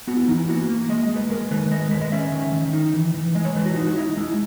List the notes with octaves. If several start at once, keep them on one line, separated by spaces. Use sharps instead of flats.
B3 F#4
E4
E3 D#4
E4
A#3 F#4
A#3
G#3 D#5
D#5
G#3
B4
G#3 A#4
D#3 B4
G#3 D#5
G#3 B4
D#5
C#4 E5
D#3
D#3
D#4
E3
E3
G#3 D#5
C#5
E3 B4
F#4
D#4 F#4
F#4
D#4 E4
D#4
G#3 E4